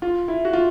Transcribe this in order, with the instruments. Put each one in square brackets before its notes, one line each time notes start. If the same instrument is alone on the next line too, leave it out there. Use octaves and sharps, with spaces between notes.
[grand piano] F4
E4
F#4
F4